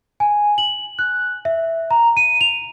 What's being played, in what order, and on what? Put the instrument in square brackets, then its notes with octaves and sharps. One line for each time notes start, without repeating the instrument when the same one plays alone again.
[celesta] G#5
F#7
F#6
E5
A#5
D#7
F7